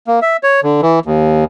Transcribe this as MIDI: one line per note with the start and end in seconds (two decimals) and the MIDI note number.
0.07 0.20 58
0.22 0.37 76
0.43 0.60 73
0.63 0.81 50
0.82 0.99 52
1.06 1.44 39